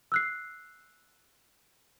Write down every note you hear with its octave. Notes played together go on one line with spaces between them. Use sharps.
E6 F#6 C7